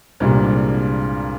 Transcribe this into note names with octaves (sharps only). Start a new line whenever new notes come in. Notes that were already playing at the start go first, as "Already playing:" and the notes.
C2 G2 A#2 G3 G#3